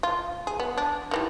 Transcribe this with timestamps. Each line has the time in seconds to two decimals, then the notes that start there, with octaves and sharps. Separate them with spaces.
0.03 F4
0.47 G#4
0.60 B3
0.78 D4
1.11 D#3 E3 G3